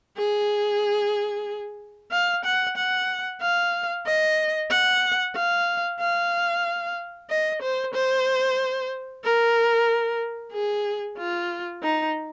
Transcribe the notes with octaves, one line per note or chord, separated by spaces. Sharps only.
G#4
F5
F#5
F#5
F5
D#5
F#5
F5
F5
D#5
C5
C5
A#4
G#4
F4
D#4